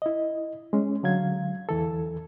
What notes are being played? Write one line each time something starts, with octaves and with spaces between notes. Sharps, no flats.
E4 D#5
G#3 C#4
D3 F#3 F5 G#6
E2 E3 A4